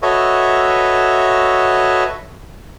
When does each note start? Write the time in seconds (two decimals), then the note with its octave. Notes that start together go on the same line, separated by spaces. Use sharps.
0.02 F#4 A4 B4 C#5 D#5 E5